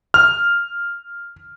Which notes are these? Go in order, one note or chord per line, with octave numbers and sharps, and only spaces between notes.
F6